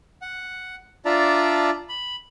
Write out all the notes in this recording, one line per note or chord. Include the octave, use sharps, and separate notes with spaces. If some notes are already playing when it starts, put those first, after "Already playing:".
F#5
D4 F4 D5 E5 A5 A#5
B5